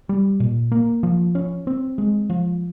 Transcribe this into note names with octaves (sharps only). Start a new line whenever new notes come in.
G3
A#2
A#3
F3
C#4
C4
G#3
F3